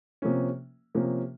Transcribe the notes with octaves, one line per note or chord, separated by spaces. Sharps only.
C3 F3 A#3 C#4
C3 F3 A#3 C#4